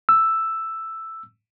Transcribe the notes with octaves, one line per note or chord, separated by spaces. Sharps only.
E6